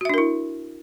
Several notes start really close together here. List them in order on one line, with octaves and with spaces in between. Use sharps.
F#4 E5 D4 A#4 E4